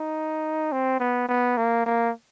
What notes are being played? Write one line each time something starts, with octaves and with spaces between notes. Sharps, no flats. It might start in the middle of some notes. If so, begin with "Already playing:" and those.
Already playing: D#4
C4
B3
B3
A#3
A#3